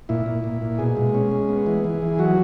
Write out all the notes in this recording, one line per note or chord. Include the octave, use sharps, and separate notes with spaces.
A#2 E4
A#2
A#2
A#2
B2 G#4
G#3
C#4
G#3
B3
E3
E3
E3
F#3 F#4